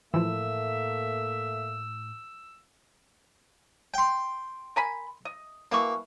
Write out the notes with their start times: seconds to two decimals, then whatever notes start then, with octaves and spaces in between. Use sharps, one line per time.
0.14 A2 E3 F3 A3 A#3 E5 E6
3.94 G5 C6
4.76 A#4 G#5 B5
5.25 D#5
5.72 B2 E3 A#3 C#6